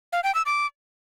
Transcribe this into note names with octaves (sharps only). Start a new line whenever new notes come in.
F5
G5
E6
D6